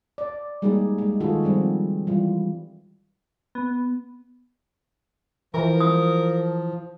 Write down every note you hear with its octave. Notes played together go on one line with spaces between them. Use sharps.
D5
G3 G#3 A#3 D#4 G4 G#4
G#3
D#3 G#3 F4 F#4 G#4 A4
D#3 F3 G3 C4
E3 G3 F4
B3
E3 F3 A#4
D#6